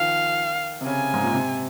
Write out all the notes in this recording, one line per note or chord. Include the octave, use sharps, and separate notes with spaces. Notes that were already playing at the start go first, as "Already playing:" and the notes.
Already playing: D#3 F3 F5
C3
C#3 G#5
G#2
A#2
C3